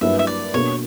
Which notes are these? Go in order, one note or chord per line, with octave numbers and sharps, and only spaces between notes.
G2 F#3 A#3 E4 B4 E5
E5
D5
B2 A#3 D4 C#5